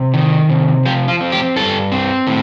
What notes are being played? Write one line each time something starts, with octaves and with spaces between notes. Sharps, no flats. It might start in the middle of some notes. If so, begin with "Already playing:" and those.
Already playing: C3
D#3
C3
F3 G4
F4
C4
G4
G2 A4
C4
A2